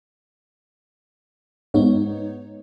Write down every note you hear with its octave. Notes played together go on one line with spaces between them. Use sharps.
G#2 B3 D#4 C#5